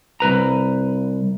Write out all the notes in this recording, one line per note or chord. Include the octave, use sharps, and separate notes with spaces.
C2 B4 A#5